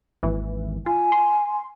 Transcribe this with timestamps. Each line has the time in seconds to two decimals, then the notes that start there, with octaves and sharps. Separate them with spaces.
0.23 G#1 D#2 E3
0.86 F4 G#5
1.12 C6